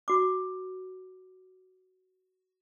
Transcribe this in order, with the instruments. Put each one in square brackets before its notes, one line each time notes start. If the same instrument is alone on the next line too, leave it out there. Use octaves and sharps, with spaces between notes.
[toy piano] F#4 D6